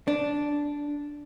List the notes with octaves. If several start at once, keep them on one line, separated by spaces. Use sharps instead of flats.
D4